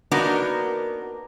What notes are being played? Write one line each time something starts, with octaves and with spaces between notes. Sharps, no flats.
A#3 B3 D4 D#4 F#4 A#4